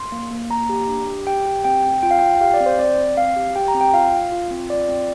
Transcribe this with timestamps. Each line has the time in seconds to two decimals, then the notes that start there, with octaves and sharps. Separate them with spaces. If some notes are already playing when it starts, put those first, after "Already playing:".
Already playing: C6
0.12 A#3
0.31 A#3
0.50 A#3 A#5
0.69 G4
0.88 D4
1.07 G4
1.27 G4 G5
1.45 G4
1.64 C4 G5
1.83 C4
2.03 F4 G5
2.11 F5
2.19 F4 G5
2.41 G4 F5
2.54 D5
2.60 C4
2.66 C5
2.79 C4 D5
2.98 C4
3.17 C4 F5
3.36 G4
3.56 G4 G5
3.68 A#5
3.74 C4
3.81 G5
3.93 F4 F5
4.12 F4
4.32 F4
4.50 C4
4.70 F4 D5
4.88 C4